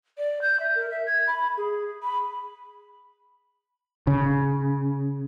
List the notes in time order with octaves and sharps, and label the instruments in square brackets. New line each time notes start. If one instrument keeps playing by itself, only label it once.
[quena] D5
G6
E5
A#4
E5
G#6
B5
G#4
B5
[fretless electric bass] C#3